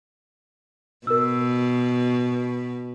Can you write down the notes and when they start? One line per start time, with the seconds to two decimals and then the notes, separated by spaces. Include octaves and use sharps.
1.07 B2 A#4 E6